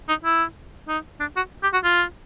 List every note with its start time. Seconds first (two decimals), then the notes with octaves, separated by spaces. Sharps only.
0.09 D#4
0.24 E4
0.88 D#4
1.20 D4
1.37 F#4
1.63 G4
1.73 F#4
1.84 F4